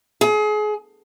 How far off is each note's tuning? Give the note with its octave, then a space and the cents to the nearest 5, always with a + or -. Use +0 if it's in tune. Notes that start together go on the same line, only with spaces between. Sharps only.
G#4 +30